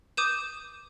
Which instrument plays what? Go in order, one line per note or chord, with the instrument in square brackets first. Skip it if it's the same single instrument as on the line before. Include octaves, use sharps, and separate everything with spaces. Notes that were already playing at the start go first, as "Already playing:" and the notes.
[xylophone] D6 D#6 G6 D#7 E7